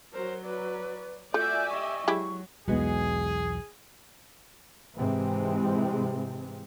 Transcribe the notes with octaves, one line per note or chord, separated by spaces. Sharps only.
F#3 A#4 C5
B4 D5
A3 F4 F#4 D5 E5 G#5 G6
G4 D#5 C#6
F#3 G#3 E4 G4
B1 E2 G#3 B3 F#4 G#4
G#2 C3 E3 G#3 C4